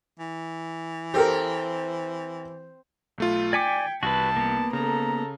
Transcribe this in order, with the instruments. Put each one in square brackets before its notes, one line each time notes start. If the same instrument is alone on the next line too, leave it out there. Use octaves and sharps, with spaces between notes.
[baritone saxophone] E3
[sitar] C4 [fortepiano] G4 A4 A#4
[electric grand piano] B1 A3 F4
[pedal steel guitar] D5 G#5 D6 [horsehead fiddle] G5 [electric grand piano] G#6 B6 C#7
[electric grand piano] C2 [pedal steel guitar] F#4 B4 [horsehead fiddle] A5
[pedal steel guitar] A#3 B3
[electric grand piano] C#3 [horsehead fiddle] A4 A#5